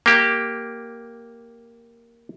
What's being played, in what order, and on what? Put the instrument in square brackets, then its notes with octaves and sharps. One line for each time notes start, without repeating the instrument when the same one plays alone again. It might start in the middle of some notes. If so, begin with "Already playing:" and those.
[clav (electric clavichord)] A#3 G4